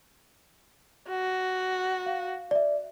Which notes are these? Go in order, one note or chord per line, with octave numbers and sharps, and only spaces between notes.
F#4
F5
D5 E5